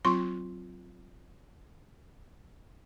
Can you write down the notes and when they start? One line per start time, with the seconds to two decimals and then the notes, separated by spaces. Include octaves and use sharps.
0.05 F#3 C4 F4 C6 C#6